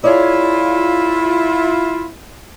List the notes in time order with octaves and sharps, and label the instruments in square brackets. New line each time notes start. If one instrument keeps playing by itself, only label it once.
[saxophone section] E4 F4 [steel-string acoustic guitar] G#4 C#5 D5